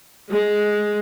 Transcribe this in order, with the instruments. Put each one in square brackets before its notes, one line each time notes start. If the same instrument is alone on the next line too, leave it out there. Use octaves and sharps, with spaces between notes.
[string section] G#3